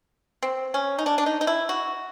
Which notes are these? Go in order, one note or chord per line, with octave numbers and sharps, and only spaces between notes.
C4
C#4
D#4
D4
D4
D#4
D#4
E4
F#4